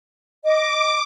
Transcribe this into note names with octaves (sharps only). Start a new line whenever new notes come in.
D#5 D6